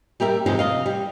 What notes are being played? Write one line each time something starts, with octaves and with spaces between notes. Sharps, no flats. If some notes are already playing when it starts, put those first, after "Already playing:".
G3 G4 A#4 E5
F2 G#2 C3 E3 F3
C3 D#5 F5
G3